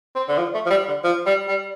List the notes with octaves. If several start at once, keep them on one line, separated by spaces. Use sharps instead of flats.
C4
D3
F3
A3
F3
G3
D3
F3
G3
G3